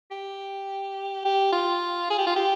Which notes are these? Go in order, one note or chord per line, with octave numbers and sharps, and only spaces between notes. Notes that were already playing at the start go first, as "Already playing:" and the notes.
G4
G4
F4
G#4
G4
F4
G4